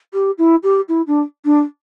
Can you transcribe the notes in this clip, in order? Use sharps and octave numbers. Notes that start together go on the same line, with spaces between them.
G4
E4
G4
E4
D4
D4